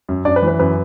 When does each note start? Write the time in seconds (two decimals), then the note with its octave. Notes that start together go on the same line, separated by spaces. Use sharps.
0.09 F#2
0.25 F#2 D4 D5
0.36 B4
0.42 E3
0.48 B4
0.59 F#2 B4